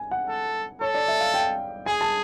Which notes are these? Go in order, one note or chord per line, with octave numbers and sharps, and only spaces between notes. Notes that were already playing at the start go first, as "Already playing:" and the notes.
Already playing: G#5
F#5
A4
A4 C#5
D5
E5
F5
G5
G#4 G#5
A5